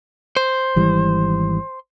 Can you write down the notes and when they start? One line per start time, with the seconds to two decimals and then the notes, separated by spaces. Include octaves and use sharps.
0.37 C5
0.76 G#1 E3 G3